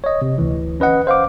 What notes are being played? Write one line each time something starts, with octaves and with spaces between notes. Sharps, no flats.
C#5 D#5
C3
D2 E3
C#4 B4 D#5 F#5
C5 F5 F#5 D6